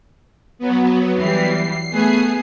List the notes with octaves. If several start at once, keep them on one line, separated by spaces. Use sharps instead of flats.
F#3 B3
E3 G3 C7
A3 B3 G#4